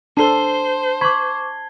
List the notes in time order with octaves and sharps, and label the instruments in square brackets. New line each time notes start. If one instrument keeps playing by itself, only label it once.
[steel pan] D4 A4 [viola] C5 [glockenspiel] A5 C7 G7
[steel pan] B5 [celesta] C#6 D6 [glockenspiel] G#6